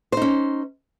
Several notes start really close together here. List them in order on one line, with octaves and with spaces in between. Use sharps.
C5 D#4 C#4